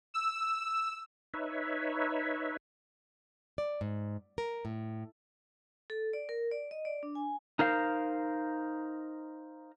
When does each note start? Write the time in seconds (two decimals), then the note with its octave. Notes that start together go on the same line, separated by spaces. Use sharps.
0.14 E6
1.34 D#4 B4 C#5 E5
3.58 D5
3.81 G#2
4.38 A#4
4.65 A2
5.90 A4
6.13 D5
6.29 A#4
6.51 D5
6.71 D#5
6.85 D5
7.03 D4
7.15 G#5
7.59 D#4 A#4 C5 F5